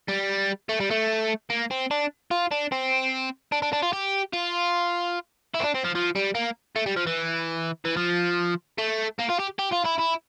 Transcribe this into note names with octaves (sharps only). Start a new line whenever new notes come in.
G3
A3
G3
A3
A#3
C4
D4
F4
D4
C4
D4
D4
D4
F4
G4
F4
E4
C4
D4
C4
F3
F3
G3
A#3
A3
G3
F3
E3
E3
F3
A3
A#3
F4
G4
G4
F4
E4
E4